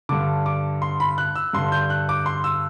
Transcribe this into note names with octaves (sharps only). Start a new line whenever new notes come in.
G2 D3 D6
D6
C6
B5
F#6
E6
G2 D3 C6
G6
F#6
D6
C6
E6